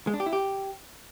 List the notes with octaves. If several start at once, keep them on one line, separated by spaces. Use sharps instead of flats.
G#3
D4
G4
E4
G4